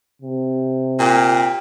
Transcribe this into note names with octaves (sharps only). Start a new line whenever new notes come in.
C3
A#2 G5